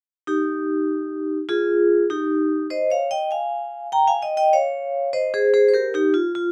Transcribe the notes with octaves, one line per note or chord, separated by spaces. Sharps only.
D#4 G4
F4 G#4
D#4 G4
C5 D#5
C#5 F5
D#5 G5
F5 G#5
G5 A#5
F5 G#5
D#5 G5
D#5 G5
C#5 F5
C5 D#5
G#4 C5
G#4 C5
C5
G4 A#4
D#4 G4
F4
F4